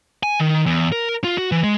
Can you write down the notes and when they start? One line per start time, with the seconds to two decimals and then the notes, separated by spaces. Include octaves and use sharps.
0.23 G#5
0.40 D#3
0.66 E2
0.92 A#4
1.24 F4
1.38 F#4
1.52 E3
1.64 G#3